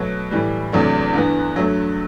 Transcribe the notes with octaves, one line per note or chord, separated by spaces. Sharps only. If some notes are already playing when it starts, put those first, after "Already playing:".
Already playing: B2 F#3 A3
A2 E3 G3
E2 C3 F#3 A3 D4
G2 E3 B3
G2 F#3 A3